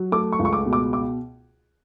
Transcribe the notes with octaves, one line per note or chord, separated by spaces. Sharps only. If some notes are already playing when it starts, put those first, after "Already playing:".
Already playing: F#3
A3 D6
C#6
C#2
C#6
D6
B2
D6
D6